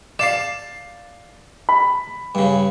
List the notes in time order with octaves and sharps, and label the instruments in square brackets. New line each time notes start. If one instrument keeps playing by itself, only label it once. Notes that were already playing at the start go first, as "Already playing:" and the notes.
[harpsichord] D5 F5 A5 [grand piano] C7 E7
[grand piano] B5
[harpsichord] G2 C#3